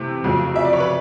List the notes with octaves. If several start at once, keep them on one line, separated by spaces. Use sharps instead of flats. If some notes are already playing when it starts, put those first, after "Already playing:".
Already playing: C3 E3 A3
F2 C#3 F#3 A3
E5
D5
C#5
B4